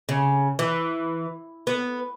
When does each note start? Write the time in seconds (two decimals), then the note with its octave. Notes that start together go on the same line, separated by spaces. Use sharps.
0.09 C#3
0.59 E3
1.67 B3